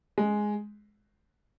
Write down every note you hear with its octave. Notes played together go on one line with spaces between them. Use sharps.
G#3